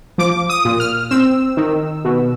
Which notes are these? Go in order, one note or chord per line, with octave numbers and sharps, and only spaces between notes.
F3 D6
D#6
A#2
F6
C4 E6
D#3
B2